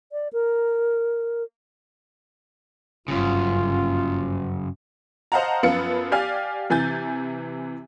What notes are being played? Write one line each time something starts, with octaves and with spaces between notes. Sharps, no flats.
D5
A#4
G1 F#2 C#3 F4
C5 D#5 F5 F#5 A5 A#5
F#2 F3 B3 F4 C#7
G4 D5 F5 G#5 F6
C3 E3 G#5 G6 A6